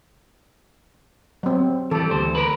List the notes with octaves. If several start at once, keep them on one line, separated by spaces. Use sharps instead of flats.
F#3 C4
E3 G3 A4
D2 C5
A#4 B4